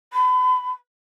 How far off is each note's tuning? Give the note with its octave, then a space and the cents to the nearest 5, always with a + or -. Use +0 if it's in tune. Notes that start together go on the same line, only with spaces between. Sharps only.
B5 +35